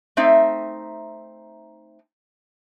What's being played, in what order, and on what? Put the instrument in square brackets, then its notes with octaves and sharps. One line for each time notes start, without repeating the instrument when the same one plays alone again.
[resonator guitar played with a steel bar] A3 C4 D#4 E5